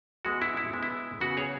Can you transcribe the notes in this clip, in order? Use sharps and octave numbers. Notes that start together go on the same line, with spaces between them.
E3 G#3 B3 F#4
E4
E4
E3 G#3 B3
E4
C#3 E3 B3 F#4
G#4 C#5